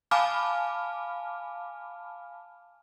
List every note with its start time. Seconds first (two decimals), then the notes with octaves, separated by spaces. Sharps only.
0.11 F5 G#5 A5 B5 D6 F6